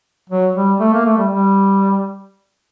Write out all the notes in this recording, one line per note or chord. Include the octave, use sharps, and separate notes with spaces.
F#3
G3
A3
A#3
A3
G3
G3